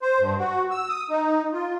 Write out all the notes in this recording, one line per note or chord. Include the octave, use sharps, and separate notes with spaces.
C5
G2
F#4
E6
D#6
D#4
F4